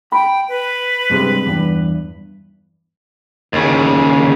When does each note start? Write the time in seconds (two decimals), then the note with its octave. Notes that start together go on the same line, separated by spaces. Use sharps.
0.12 G5 B5
0.49 B4
1.10 G2 C3 G#3
1.46 E2 G2
3.53 D#2 C#3